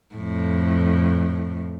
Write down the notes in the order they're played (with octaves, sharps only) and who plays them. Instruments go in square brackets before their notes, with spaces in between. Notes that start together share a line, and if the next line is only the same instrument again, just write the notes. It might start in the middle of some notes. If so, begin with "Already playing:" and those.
[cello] F2 A2